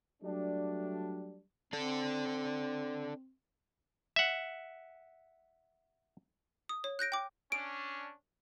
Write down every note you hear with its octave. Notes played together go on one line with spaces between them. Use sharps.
F#3 G3 A3 D4
C4 D4 A4
E5 F#5
D#6
C#5
F#6 G6 A#6 D7
G5 D6
C#4 D4 D7